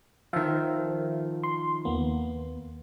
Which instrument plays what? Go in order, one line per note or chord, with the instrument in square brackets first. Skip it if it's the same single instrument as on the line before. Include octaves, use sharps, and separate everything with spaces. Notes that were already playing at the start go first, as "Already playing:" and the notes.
[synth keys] D#3 F3 [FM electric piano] E5 F5
[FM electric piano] C6
D#2 A#3 B3